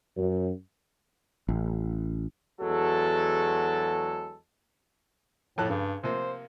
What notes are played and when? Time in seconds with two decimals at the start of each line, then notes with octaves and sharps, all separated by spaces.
0.17 F#2
1.48 A1
2.61 E2 F#3 G#3 F#4 A4
5.58 F2 A2 A4 F#6
5.70 G2 C#3
6.03 C3 F3 A#3 C5